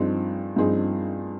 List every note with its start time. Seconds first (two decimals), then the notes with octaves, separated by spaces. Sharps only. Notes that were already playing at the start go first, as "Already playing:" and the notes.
Already playing: G2 F3 C4 D#4 G#4
0.56 G2 F3 C4 D#4 G#4